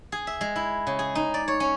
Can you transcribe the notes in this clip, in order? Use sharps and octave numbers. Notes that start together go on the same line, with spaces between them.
G#4
E5
G#3
E4
C#3
G#4
D#4
D5
C#5
C#4